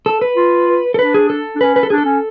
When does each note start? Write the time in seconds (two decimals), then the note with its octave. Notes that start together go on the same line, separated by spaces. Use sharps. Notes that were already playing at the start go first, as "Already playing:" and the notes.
0.06 A4
0.21 B4
0.36 F4
0.94 A4
0.98 D4 B4
1.14 G#4
1.30 A4
1.55 D4
1.61 C#4 B4
1.76 B4
1.83 A4
1.90 D4 G#4
1.98 A4
2.05 C#4